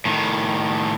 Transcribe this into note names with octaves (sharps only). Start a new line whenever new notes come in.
A2 D#3